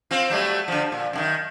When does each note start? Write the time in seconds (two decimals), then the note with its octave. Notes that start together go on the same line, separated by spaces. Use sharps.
0.11 C4 F4
0.30 F#3 G3 A3
0.68 D3 F3
0.92 A#2
1.13 F#2 D3 D#3